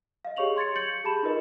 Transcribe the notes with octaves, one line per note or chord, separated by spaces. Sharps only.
D#5 F5
G4 G#4 C#5 C#6 F7 F#7
C6 G#6 A6 C#7
G6 A6 C#7 F#7
G4 G#4 A5 B5 E7
D#4 F4 A#4 B4 D#5